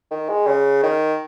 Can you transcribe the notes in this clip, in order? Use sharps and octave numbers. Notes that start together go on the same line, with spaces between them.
D#3
G#3
C#3
D#3